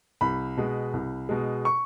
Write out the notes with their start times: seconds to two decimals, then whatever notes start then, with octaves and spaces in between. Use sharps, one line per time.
0.21 C2 B5
0.57 B2 G#3
0.93 C2
1.29 B2 G#3
1.65 C#6